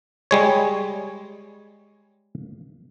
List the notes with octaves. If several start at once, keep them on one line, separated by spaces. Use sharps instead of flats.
G3 G#3 C#5